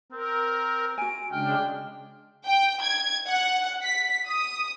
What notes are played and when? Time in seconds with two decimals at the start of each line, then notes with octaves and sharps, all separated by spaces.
0.12 C4 A#4
0.98 F#4 G#5 D7
1.32 C#3 G#3 D4 G5 F6
2.45 G5
2.82 G#6
3.27 F#5
3.82 B6
4.27 D#6